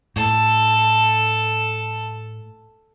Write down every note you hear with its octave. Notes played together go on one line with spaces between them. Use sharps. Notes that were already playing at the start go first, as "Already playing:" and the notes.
A2 A4